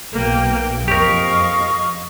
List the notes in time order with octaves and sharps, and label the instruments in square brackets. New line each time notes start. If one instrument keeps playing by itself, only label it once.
[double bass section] B1 [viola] A#3 G5
[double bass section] F2 [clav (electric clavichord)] G4 A#4 [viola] D#5 F5 [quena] C#6